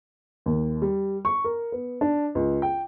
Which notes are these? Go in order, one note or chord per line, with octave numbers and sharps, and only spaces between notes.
D#2
G3
C#6
A#4
B3
D4
C#2
G5